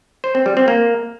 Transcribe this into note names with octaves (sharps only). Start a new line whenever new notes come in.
C5
C4
G3
C4
A#3